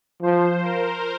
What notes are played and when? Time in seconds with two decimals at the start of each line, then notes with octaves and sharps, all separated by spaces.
0.23 F3 C5
0.63 A#4